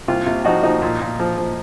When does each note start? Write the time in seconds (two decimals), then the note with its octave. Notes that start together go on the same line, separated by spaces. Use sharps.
0.08 C2 F4
0.26 C3 F4
0.45 F3 D#4 F#4
0.63 F3 D#4
0.82 A#2
1.02 A#2
1.20 F3
1.38 F3